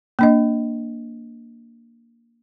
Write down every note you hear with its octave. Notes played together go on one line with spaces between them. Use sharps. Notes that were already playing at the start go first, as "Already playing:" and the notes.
A#3 D4 D#5